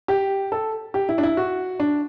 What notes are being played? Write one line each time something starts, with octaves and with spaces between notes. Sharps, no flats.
G4
A4
G4
E4
D4
E4
F#4
D4